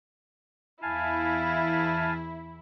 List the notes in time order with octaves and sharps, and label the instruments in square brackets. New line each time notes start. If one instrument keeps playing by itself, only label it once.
[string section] E2 E4 [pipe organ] F5 G#5 A5